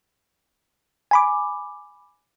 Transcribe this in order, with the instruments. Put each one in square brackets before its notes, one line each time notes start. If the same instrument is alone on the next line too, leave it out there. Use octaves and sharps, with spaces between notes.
[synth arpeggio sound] G#5 B5 D6